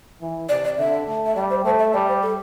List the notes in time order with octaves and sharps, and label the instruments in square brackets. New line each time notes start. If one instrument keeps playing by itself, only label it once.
[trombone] E3
[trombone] C3 [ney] D5
[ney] D5
[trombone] D3 [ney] E5
[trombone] A3
[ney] E5
[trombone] G3 [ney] D5
[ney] C5
[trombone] A3 [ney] C5
[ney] E5
[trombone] G3 [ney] D5
[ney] C5
A4